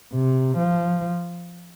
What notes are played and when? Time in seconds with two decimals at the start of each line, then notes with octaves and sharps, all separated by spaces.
0.14 C3
0.58 F3